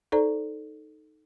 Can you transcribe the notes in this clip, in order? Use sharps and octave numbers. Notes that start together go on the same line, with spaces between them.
D#4 A4 C5 D5 A#5